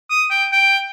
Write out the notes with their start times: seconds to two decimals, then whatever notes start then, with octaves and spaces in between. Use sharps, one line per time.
0.10 D#6
0.30 G5
0.52 G5